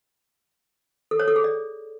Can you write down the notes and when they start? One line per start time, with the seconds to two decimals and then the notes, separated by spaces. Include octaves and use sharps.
1.11 A4
1.19 C#5
1.28 A4
1.36 G#4
1.44 D5